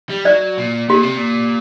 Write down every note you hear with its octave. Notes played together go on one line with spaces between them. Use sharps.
G3
F#3 D5
A#2
A#2 G4
C3
A#2